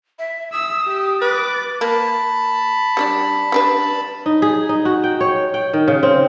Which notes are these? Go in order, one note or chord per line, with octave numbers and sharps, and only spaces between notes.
E5
D#6 E6
G4
B4 D6 A6
A#3 A5 B5
G3 D4 D5
G3 D4 B4
D#4
G#4
D#4
F#4
G5
C#5
G5
D#3
C#3
C4